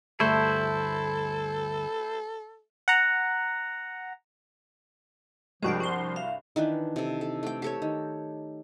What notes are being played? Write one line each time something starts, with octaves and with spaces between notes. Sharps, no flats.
D2 G2 A3 E4 A4 C5
F#5 A#5
C2 G2 F3 G#3 F#4 C5 G5
F#4 C6
E5 F5
D#3 E3 D4 B4
C3 A4
A4
A3 G5
G4 A4 C#5
D#3